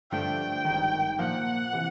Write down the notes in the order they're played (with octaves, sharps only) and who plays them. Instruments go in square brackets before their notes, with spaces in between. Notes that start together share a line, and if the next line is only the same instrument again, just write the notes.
[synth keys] G2 D3 F3 A3 D4 [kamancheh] G5
[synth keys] G#1 G2 D#3
[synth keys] A#2 F3 A#3 [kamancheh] F#5
[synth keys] C3 E3